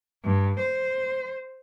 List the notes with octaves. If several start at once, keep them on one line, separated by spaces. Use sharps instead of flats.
G2
C5